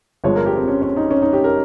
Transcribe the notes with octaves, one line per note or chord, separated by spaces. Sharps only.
G1 G2 F3 G#3 C#5
A#4
G4
C4
C#4
C#4
D#4
C#4
D#4
G4
A#4